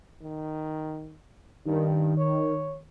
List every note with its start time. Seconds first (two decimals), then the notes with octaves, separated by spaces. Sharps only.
0.23 D#3
1.66 G2 D#3
2.18 C#5